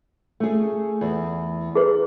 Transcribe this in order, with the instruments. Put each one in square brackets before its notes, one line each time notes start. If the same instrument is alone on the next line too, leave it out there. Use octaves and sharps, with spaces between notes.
[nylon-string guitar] A3 G#4
E2
[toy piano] G#4 B4 C#5